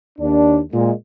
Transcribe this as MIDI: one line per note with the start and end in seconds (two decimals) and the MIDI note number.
0.19 0.60 39
0.19 0.60 62
0.73 0.92 46
0.73 0.92 56